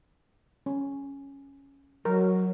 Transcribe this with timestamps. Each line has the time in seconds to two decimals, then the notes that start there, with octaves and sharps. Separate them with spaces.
0.66 C#4
2.05 F#3 A#4